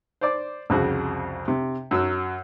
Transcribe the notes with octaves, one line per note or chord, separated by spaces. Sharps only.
C5 D5 D6
C2 F2 C#3 F#4
C3
F#2 F#3 E6